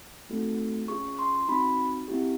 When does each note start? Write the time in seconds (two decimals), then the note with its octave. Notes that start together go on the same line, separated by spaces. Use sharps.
0.29 A3 C4 D#4 F#4 A4
0.88 C#4 F4 G#4 C#6
1.19 C6
1.48 C4 D#4 F#4 B5
2.08 C4 E4 G4